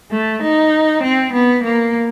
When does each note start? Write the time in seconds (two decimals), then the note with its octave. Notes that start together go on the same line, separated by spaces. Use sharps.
0.11 A3
0.42 D#4
1.03 C4
1.33 B3
1.64 A#3